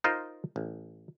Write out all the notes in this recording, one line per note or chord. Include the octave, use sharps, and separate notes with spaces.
D#4 F4 A#4 C5 D#5
A1